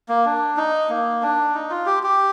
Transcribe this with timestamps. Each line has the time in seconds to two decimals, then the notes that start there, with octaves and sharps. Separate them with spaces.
0.09 A#3
0.25 D4
0.57 D#4
0.90 A#3
1.22 D4
1.55 D#4
1.70 F4
1.86 G4
2.03 G4